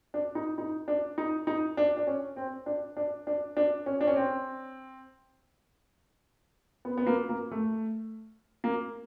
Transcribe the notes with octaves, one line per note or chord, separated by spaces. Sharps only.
D4
D#4
D#4
D4
D#4
D#4
D4
D4
C#4
C4
D4
D4
D4
D4
C#4
D4
C#4
C4
B3
B3
A#3
A#3
A3
A#3